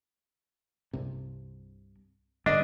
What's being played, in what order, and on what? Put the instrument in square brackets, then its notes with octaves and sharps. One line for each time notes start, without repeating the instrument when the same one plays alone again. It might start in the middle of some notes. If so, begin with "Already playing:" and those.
[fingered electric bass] C2 G2 C3
[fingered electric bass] G#2 D3 G3 [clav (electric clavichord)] D4 [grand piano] D#5